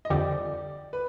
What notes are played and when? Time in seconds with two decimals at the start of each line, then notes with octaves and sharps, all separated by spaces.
0.05 D#5
0.10 F2 D3 G3 D5
0.93 B4